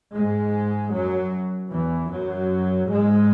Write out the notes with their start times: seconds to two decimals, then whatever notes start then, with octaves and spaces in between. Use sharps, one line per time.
0.13 G#2 G#3
0.92 F#2 F#3
1.71 E2 E3
2.10 F#2 F#3
2.89 G#2 G#3